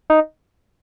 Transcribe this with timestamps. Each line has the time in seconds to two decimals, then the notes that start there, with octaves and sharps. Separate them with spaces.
0.10 D#4